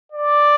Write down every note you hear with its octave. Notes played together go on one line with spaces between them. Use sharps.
D5